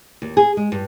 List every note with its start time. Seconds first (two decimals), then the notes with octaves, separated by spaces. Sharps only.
0.22 D#2
0.37 G#4
0.57 G#3
0.72 G2